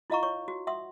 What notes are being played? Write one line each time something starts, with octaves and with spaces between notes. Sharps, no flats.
E4 F4 D#5 F5 A#5 C#6
C#5 C#6
F#4
E5 F#5 C6 D#6